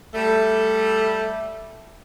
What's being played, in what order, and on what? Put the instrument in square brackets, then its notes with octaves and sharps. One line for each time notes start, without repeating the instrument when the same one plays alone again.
[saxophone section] G3 A3